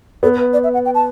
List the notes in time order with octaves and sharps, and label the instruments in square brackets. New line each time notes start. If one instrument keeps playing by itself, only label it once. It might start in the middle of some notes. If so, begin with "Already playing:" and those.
[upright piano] B3 [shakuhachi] A4
[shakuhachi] B4
D5
E5
F#5
G5
A5